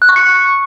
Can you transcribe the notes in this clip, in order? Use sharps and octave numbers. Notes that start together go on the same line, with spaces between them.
F#6
C#6
C#7